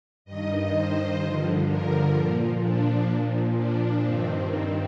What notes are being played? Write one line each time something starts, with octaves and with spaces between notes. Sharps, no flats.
G2 D#3 D#5
C5
G2 D3 F3
A#4
A#2 F3
D4
A#2 F3
D4
G2 D#3 C4